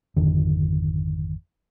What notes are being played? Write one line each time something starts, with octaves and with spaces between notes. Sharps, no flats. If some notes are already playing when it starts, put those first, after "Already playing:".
G#1 F2 D3 D#3